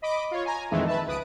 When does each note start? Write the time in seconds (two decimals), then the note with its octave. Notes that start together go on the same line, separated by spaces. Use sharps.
0.02 D#5 B5 D6 D7
0.31 F4 C#5
0.45 G#5 A#5
0.71 F2 A#2 D#3 E3 G#3 A3
0.87 B4 E5 A5
1.07 C#2 B4 D#6 D7